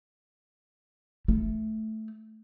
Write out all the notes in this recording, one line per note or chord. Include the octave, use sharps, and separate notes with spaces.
A3